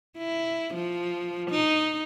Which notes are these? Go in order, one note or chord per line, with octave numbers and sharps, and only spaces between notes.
E4
F3
D#4